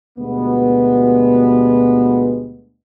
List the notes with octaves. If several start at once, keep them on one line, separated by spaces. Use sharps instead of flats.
D2 B2 G3 G#3 B3